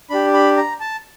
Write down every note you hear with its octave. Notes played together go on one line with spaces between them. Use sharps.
D4 G4 B5
B5
A#5
A5